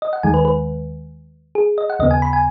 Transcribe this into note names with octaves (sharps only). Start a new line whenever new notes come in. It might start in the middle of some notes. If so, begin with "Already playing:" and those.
D#5
F#5
D#2 D#3 G#3 G#5
B4
B4
G#4
D#5
F#5
D#2 C#3 B3 D#5
G#5
B5
G#5